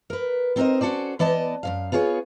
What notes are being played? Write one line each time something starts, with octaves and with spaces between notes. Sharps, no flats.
A#4 B4
B3 C4 D#4 A#4 C5 D#5
C#4 F#4 A4 C5 D5
E3 B3 D5 D#5 A5
F#2 C#3 F5
B3 F4 G#4 C5 C#5